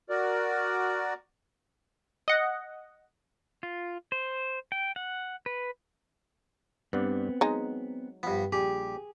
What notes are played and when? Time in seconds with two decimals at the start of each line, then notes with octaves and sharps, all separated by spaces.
0.10 F#4 A#4 D5
2.28 D#5 F#5
3.63 F4
4.12 C5
4.72 G5
4.96 F#5
5.46 B4
6.93 G2 B3 C4 D5 F#5
7.41 F#3 G#3 D#4 A#5
8.23 G2 F3 B3
8.52 A#1 G3 G4 G#4